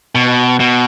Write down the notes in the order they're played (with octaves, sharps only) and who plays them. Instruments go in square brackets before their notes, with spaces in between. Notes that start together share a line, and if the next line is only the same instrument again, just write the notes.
[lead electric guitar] B2
B2